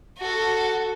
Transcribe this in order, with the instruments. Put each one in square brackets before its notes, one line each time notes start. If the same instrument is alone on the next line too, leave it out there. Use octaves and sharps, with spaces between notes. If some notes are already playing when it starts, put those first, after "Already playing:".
[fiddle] F#4 A4